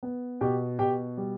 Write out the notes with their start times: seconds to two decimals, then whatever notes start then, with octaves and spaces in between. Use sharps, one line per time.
0.03 B3
0.41 B2 G4 G5
0.79 B2 G4 G5
1.17 G3